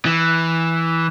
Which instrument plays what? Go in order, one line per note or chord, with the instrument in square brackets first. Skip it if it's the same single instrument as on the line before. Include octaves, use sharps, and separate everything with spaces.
[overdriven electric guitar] E3